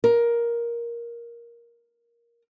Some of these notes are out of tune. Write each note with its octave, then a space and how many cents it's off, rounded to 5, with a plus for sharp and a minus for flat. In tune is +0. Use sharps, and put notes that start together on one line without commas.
A#4 +10